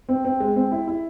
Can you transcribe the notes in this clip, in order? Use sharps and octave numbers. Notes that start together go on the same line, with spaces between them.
C4
C4
G#3
C4
E4
E4